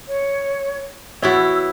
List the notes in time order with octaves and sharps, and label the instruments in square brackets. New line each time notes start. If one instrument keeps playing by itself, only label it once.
[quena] C#5
[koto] E3 B3 E4 [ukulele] F#4 C#5 [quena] E6